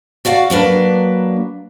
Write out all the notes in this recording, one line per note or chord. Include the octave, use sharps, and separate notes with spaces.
F#4 D5 F5 F#5
F#3 A#3 D4 B4